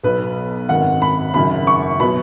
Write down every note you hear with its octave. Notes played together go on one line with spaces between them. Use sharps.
B1 B2 F#3 B3 B4
G#1 F#2 D#3 F#5
B5
F#1 F#2 D#3 B5
C#6
B2 F#3 B3 B5